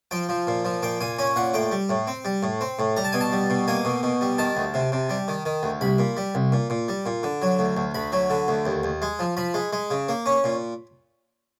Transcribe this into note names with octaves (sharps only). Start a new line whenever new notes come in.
F3 G5
F3
A#2
F3
A#2 G5
A#2 G#5
C#4 G#5
A#2 F#5
A2 G5
G3
A2
C4
G3
A2
C4
A2
G3 A#5
A5
B2 G#5
A5
G3
B2
A#3 G#5
B2
B2
G3
D#3 A5
D2
C3
C3
G3
D#3
D#3
D2
C2 B5
A#2
G3
C2
A#2
A#2
G3
A#2
D3
F#3
D2
D2
D2 B5
F#3
D3
D2
D#2
D#2
G#3
F3
F3 B5
G#3
G#3
C#3
A#3
C#4
A#2